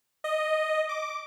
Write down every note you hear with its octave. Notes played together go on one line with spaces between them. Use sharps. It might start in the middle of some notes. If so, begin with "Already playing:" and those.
D#5
D6